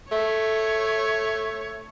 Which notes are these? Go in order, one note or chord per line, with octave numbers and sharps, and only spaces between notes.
A3 C#5